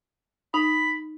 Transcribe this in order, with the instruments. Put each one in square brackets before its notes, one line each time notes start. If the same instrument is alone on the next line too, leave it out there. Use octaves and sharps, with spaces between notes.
[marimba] D#4 [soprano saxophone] B5